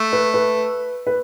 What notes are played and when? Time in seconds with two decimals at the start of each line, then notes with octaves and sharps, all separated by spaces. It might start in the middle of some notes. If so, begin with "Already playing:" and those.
Already playing: A3
0.13 B4
0.34 B4
1.07 B4